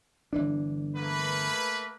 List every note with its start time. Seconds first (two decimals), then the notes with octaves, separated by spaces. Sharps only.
0.33 G1 E3 D4
0.96 A3 A#3 B4